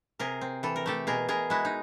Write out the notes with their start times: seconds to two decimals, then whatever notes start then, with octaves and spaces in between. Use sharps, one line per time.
0.19 C3 G#4 A#4
0.41 C4
0.63 E3 A4
0.76 A#4
0.86 A3 G4 A4
1.07 B2 G#4 A#4
1.29 B2 G#4 A#4
1.50 G#3 E4 F#4
1.65 D#4